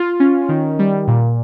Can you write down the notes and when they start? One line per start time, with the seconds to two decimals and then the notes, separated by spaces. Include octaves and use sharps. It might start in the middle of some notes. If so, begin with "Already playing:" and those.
Already playing: F4
0.20 C#4
0.49 D#3
0.79 G3
1.08 A#2